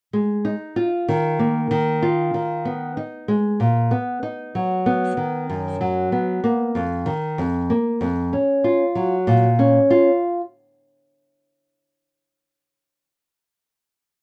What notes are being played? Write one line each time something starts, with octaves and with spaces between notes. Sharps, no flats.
G#3
D#4
F4
D#3
A#3
D#3
F4
D#3
B3
D#4
G#3
A#2
B3
D#4
F#3
B3
D#3
F#2
F#3
B3
A#3
F2
D#3
F2
A#3
F2
C#4
F4
F#3
A#2
C#4
F4